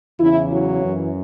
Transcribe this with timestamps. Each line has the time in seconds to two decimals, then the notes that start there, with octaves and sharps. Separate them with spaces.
0.19 E2 C#3 E3 E4
0.51 F#3
0.83 F#2 E3